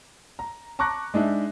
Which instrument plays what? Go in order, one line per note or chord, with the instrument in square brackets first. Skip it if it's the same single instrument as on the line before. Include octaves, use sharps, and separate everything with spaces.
[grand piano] A#5
A5 A#5 C#6 D6 F#6 A#6
G#3 D4 D#4 E5